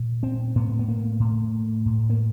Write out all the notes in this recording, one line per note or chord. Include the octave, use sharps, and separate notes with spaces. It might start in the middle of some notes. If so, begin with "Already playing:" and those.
Already playing: A#2
C4
A2 B3
B3
A#3
A2
A2
A#3